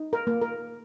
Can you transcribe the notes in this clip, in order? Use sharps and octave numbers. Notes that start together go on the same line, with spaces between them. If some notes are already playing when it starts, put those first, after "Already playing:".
Already playing: D#4
A#4
A#3
A#4